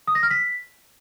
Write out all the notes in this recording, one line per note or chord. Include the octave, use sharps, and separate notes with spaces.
D#6
A#6
F6
B6